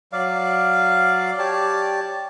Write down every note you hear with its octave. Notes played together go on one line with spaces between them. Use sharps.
F#3 D5 F5
G4 C#5 D5 A5